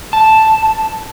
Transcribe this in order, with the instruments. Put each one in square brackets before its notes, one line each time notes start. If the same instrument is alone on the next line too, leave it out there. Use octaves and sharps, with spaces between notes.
[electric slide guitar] A5